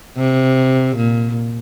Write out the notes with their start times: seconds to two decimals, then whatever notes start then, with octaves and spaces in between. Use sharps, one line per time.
0.17 C3
0.96 A#2